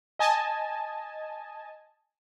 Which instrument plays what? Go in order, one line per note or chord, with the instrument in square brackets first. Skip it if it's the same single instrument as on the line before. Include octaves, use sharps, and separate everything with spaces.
[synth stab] D#5 G#5 A5